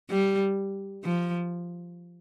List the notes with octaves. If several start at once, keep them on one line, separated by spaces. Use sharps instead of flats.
G3
F3